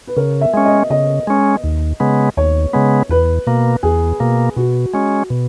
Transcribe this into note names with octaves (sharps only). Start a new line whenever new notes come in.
B4
C#3 A#4
E5
G#3 C#4
D#5
C#3 D#5
G#3 C#4
D#2
C#3 G#3 B3
D#2 C#5
C#3 G#3 B3
E2 B4
B2 A#3
E2 G#4
B2 A#3
B2 F#4
G#3 C#4
B2